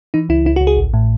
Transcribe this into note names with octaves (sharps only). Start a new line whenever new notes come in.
E3 D#4
C#2 E4
C#2 E4
F#4
C#2
G#4
A1
A2